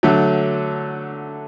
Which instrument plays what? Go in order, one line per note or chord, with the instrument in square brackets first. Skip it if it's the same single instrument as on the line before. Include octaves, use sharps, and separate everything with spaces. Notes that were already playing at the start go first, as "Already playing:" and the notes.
[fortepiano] D3 F#3 A3